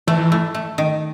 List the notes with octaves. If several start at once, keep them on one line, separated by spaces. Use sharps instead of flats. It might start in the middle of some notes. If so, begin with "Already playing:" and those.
E3 A3
A3
A3
D#3